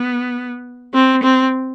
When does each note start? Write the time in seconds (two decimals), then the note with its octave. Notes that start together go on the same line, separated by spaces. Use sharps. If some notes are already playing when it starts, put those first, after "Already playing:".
Already playing: B3
0.94 C4
1.23 C4